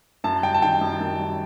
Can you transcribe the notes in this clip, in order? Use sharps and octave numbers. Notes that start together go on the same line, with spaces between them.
F#2 A5
G3 G5
A5
D#3 G5
F#2
F#2
G3